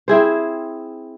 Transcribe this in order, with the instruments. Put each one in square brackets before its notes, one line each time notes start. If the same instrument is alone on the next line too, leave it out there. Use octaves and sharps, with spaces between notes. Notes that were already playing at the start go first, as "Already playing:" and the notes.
[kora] C4 E4 G#4 C5